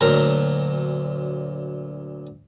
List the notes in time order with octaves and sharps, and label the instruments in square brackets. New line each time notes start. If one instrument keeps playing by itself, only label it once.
[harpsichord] D2 A#2 F#3 A#4 A#5